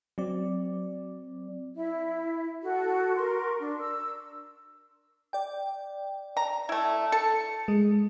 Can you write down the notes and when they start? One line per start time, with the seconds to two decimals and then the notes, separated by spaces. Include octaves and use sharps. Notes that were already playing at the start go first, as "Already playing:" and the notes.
0.18 F#3 C4 D5
1.77 E4 E5
2.63 F#4 A4
3.16 A#4 C6 C#6
3.59 D4
3.80 E6
5.33 D5 G5
6.37 A#5
6.69 A3 E4
7.12 A4 C#7
7.68 G#3